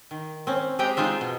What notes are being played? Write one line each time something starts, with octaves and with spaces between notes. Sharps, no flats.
D#3
C4 C#4
G#3 C4 G4 G5 A#5
G#3 D#4 F4 E5
B2